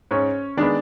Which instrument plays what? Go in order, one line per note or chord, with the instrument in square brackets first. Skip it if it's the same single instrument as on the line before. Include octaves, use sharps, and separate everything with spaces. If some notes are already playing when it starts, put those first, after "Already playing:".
[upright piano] G#2 C#4 C#5
D#3 G#3 B3 D4 D5